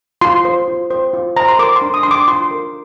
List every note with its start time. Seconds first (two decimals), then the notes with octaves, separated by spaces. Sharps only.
0.21 F4 C6
0.45 C5
0.68 F4
0.91 C5
1.13 F4
1.37 C5 A#5
1.48 C6
1.59 A#4 D6
1.76 C6
1.82 D4
1.94 D#6
2.03 D4 C6
2.11 D6
2.28 F4 C6
2.51 A#4